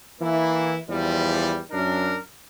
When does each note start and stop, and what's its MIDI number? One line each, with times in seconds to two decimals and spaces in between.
0.21 0.77 52
0.21 0.77 58
0.21 0.77 64
0.89 1.60 40
0.89 1.60 53
0.89 1.60 55
1.72 2.18 42
1.72 2.18 62
1.72 2.18 70